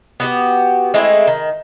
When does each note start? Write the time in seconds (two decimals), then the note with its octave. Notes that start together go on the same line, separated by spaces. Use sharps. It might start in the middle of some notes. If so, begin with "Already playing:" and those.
0.20 B3 F#4 G4
0.94 G#3 A3 C4 E4
1.28 D#3